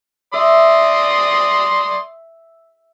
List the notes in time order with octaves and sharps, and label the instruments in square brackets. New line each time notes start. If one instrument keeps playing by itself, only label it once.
[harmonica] D5 C6 D#6 [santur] E5